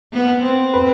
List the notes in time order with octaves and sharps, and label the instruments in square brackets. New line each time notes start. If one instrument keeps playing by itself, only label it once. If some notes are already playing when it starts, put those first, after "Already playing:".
[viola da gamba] B3
C4
[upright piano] B4